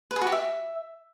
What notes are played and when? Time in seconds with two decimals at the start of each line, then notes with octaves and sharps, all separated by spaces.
0.11 B4
0.16 G#4
0.21 F#4
0.27 G4
0.32 E5